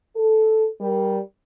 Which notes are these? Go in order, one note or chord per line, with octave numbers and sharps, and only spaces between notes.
A4
G3 A#4